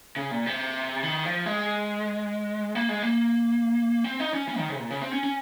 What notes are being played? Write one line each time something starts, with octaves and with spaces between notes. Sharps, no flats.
C#3
A#2
C3
D#3
F3
G#3
A#3
G#3
A#3
C4
D#4
C#4
C#4
D#3
C#3
C3
A#2
C#3
C4
C#4
C#4